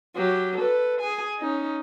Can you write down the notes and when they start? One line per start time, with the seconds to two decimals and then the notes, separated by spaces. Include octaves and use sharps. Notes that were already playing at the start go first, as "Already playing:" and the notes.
0.16 F#3 G4
0.57 A4 B4
1.01 G#4 G#5
1.39 C#4 D#4